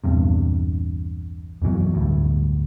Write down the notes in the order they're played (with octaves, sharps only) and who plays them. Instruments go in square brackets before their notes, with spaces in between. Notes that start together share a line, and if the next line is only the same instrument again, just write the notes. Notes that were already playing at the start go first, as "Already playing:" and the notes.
[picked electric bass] A#1 E2 G2 C3
F#2 B2 E3 F#3
D1 D2 G2